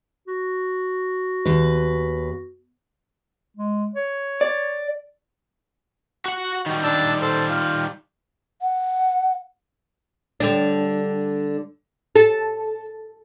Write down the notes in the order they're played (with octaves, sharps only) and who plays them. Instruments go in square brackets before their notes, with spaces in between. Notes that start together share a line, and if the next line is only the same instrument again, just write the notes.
[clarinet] F#4
[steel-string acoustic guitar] D#2 B4
[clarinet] G#3
C#5
[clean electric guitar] D5
[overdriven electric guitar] F#4 F#5
[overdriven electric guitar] D#3 G3 [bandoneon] F#4
[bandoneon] D4 A5 E6
A4 C5 A5
F4
[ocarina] F#5
[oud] D3 G3 D4
A4